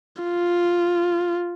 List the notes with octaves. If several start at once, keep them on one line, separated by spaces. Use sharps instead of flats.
F4